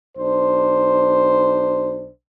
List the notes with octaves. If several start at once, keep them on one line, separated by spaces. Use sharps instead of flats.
B1 D4 C5